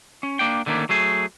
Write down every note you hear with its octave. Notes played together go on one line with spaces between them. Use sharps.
C#4
A#3 D4 G5
D3 D#3 A3 A#3 C#4
F#3 A3 G#4